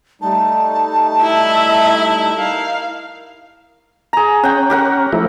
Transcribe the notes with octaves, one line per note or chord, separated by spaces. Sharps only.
G3 A3 D#4 A5
E4 E5
D#4 A#4 F5
G#4 A#5
C#4 F#5 G5
G4 A#4 F#5
F3 A3 E4